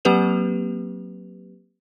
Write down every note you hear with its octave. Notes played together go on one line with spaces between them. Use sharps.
F#3 A#3 C4 G4 B4 F7